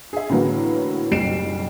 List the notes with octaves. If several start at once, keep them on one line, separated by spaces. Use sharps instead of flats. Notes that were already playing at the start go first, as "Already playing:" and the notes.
G#4 E5
A2 D3 E3 F#3 A#3 B3
F#1 B1 G3 C7 D7 E7